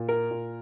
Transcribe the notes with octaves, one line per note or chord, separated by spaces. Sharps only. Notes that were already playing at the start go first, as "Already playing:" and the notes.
Already playing: A#2
A#4
A#2